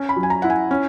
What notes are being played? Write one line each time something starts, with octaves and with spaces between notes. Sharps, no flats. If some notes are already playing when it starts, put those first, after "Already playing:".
Already playing: C#4
B5
F#3
G#5
A#5
E4 F#5
G#5
C#4